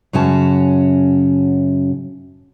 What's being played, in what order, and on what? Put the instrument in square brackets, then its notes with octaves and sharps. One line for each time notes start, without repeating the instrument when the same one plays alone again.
[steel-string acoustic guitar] F#2 C#3 C#4 F#4 A5